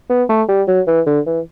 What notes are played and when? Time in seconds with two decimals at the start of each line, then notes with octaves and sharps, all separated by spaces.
0.10 B3
0.29 A3
0.49 G3
0.67 F#3
0.87 E3
1.06 D3
1.26 E3